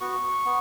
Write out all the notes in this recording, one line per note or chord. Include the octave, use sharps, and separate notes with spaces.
B3 F#4 C#6
B3